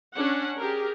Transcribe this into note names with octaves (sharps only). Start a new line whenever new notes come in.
C#4 D4 F#5
G4 G#4 A#4